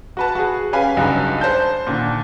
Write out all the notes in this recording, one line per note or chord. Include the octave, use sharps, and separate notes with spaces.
F#4 B4 A5
F#4 G#4
C#4 G4 B4 F5 G#5
C#2 G2 F#3 D#4 G#5
C5 A5 G6
A#2 D3 D#3